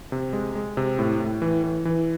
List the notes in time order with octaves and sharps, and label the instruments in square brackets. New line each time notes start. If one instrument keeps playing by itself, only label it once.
[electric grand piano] C3
G#3
G#3
C3
A2
A2
E3
E3
E3